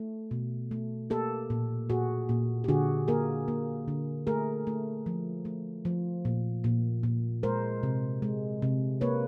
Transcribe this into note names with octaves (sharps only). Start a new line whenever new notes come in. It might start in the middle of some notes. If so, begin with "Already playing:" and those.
Already playing: A3
B2
A3
A#3 G4 A4
A#2
A#2 F#4 G#4
A#2
G4
D3 F#4 G#4
A#3 G#4 A#4
A#3
D3
A3 G#4 A#4
A3
F3
A3
F3
A#2
A#2
A#2
G#3 A#4 C5
C3
G#3
C3
A#3 B4 C#5